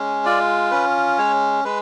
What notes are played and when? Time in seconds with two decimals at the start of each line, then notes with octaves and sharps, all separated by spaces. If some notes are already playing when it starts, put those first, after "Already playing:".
Already playing: G#3 C#4
0.25 F4 D5
0.71 C#4 B4
1.18 G#3 C#5
1.64 G#3 B4